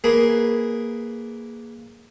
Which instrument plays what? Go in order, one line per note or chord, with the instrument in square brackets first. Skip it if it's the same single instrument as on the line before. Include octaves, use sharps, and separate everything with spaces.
[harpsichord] A#3 G#4 B4